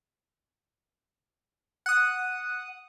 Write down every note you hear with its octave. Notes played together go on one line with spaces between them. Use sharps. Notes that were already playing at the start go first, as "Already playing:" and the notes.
F#5 D#6